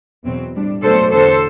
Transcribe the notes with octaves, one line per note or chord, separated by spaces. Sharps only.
E2 B2 F#3 C4
A2 G3 D4
B2 F#3 A3 D4 A4 C5
E2 D3 F#3 A4 C5